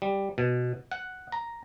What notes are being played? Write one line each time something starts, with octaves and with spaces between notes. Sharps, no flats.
G3
B2
F#5
A#5